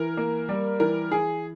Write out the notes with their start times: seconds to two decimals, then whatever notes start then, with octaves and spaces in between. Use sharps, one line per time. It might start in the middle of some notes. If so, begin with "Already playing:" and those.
Already playing: E3 A#4
0.17 A#3
0.49 G3
0.80 E3 A#4
1.11 E3 G#4